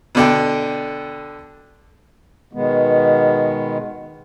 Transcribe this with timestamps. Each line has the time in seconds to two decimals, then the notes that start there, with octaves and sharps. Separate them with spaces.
0.15 B2 D3 G5
2.53 B2 D#3 G#3 B3